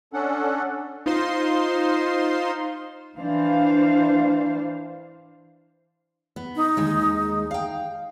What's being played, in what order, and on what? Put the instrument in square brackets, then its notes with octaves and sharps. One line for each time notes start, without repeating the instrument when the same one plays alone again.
[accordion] C#4 D4 A4 F#5
[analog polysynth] D#4 F4 C5 C6
[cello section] E3 D4 C5 F5
[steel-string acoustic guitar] B3
[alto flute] D#4
[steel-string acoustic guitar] D#2 D#3 G#3
F5 G5